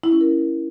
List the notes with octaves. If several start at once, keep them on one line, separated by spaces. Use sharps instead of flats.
E4
C#4
A#4